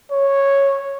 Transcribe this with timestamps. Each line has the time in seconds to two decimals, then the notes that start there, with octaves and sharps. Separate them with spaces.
0.11 C#5